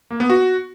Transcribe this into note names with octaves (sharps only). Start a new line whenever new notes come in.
A#3
B3
F#4